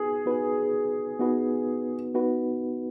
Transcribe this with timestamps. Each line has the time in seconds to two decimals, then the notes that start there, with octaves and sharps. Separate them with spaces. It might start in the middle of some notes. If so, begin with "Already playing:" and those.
Already playing: B3 D#4 F#4 G#4 B4
0.26 B3 D#4 F#4 B4
1.19 B3 D#4 F#4 B4
2.14 B3 D#4 F#4 B4